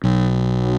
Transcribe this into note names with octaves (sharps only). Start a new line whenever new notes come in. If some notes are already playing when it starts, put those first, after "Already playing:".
B1